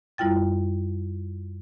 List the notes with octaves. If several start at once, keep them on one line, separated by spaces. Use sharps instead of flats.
F#2 G3 E4 F4 G5 A6